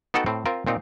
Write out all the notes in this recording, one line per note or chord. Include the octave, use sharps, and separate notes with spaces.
B3 D#4 F#4 A4 F#5 G5
A2 C4
C4 F4 A#4
A#2 C4 D#4